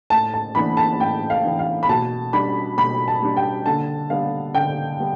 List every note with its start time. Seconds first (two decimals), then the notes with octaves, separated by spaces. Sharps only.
0.10 A2 A5
0.34 A5
0.55 E3 B3 D4 B5
0.77 A5
0.99 A2 G5
1.30 F5
1.44 E3 B3 D4
1.59 F5
1.83 B5
1.89 B2 A5
2.33 G3 D4 B5
2.77 B2 B5
3.08 A5
3.22 G3 D4
3.37 G5
3.66 D3 A5
4.10 G3 B3 D4 F5
4.55 D3 G5
5.00 G3 B3